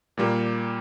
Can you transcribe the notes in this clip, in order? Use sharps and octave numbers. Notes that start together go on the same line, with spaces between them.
A#2 G3 A#3